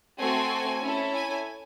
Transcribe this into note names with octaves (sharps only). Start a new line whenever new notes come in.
A3 C4 F#4 A4 G#5
C#4 E4 A4
G#5